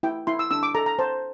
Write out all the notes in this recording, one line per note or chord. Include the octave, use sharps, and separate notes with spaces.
E4 G5
E4 C6
E6
D4 E6
D6
A4 A#5
A#5
C5 A5